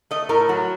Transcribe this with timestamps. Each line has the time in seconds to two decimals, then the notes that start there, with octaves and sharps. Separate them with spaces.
0.11 A3 D#5
0.29 A2 A#4
0.49 F#3